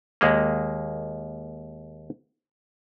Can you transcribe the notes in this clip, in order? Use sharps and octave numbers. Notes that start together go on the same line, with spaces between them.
D#2 G#3 A#3